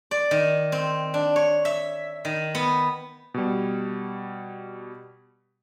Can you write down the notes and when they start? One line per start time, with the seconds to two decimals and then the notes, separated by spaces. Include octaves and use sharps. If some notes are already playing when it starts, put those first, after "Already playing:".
0.11 D5
0.31 D#3
0.72 C4
1.14 D4
1.36 C#5
1.65 E5
2.25 D#3
2.55 B3
3.34 B2 G3